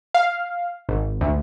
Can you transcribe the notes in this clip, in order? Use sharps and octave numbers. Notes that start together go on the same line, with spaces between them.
F5
G#1
D2